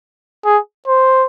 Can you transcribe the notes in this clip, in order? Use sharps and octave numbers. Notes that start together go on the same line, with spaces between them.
G#4
C5